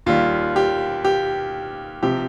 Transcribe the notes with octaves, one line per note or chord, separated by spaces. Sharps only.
D#2 D#3 G3 F4
G4
G4
C3 F3 G4